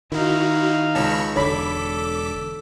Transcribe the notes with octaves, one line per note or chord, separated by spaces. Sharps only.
D#3 D#4 E4 F#4 F5
C#2 A5 B5 C#6 E6
E1 B1 D3 A4 C#5 B5 D6 B6